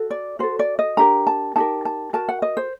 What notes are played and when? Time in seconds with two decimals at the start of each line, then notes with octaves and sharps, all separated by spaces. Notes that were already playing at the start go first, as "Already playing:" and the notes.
Already playing: F#4 A4
0.11 D5
0.39 F#4 A4 C5
0.59 D5
0.79 D#5
0.97 D4 G4 A#4 A#5
1.27 A5
1.56 D#4 G4 A#4 A5
1.85 A5
2.13 F#4 A#4 A5
2.29 F#5
2.42 D#5
2.57 C5